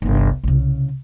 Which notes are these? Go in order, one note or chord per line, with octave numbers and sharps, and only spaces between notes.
G1 C2
C2 C#3